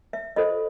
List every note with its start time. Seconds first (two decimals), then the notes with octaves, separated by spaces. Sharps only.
0.13 E5
0.36 F4 A4 C5 D#5